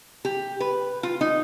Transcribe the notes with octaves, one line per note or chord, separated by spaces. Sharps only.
G4
B4
F4
D#4